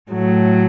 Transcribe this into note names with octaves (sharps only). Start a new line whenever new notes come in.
A2 F#3 A3